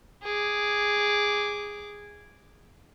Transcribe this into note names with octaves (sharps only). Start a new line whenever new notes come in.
G#4 D6